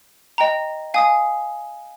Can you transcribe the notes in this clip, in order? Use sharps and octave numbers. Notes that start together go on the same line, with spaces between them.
D#5 G5 A#5
F5 G#5 D#6